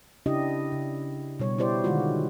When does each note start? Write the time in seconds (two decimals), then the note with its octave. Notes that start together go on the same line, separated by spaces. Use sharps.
0.26 C#3 D4 E4 G4 D#5
0.72 C#3
1.40 B2 G3 C#5
1.58 E4 G4 C5 D5
1.84 D3 D#3 G#3 F4 F#4